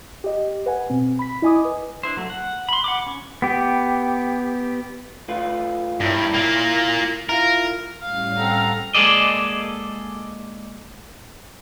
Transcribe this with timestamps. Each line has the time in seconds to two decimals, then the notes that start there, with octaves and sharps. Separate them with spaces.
0.24 G4 D#5
0.66 B4 F#5 G#5
0.90 B2 C4
1.19 B5 B6
1.42 E4 D#5 G#5 D6 D#6
1.65 B4
2.03 D4 E4 C5
2.17 F#3 A3
2.30 F#5
2.69 B5 C6
2.84 F#5 B5 D6
3.07 C#4 C#6
3.42 B3 G4
5.28 A3 F4 B4
6.01 G2 E4 A#4 C#5
6.34 A#3 F4
7.29 E4 F4 A#4
8.03 A2 G3 C#4 F5
8.38 C4 A4 F#5 A#5
8.94 G#3 A#3 G#4 A4 D5 D#5